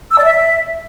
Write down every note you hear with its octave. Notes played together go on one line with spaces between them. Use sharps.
E6
D5
E5